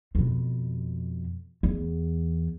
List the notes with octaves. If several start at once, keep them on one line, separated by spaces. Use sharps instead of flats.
F2 B2
E2